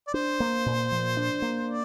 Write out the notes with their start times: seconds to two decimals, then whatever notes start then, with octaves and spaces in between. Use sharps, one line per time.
0.07 D5
0.14 D4 C5
0.40 A#3
0.66 A#2
0.91 F3
1.17 D4
1.42 A#3
1.68 D5